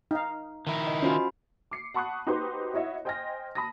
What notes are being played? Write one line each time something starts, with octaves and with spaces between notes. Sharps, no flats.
D#4 F5
D#3 E4
D#5
C#4 F4 F#4 C5 B5
D6 C7 C#7
F#5 A5 B5 C#6 D#6 F#6
D#4 F#4 G4 B4 C5 C6
E4 F#4 C#5 D#5 E5 F#5
C5 D#5 G5 G#5 F6 A#6
A5 B5 D#6 A#6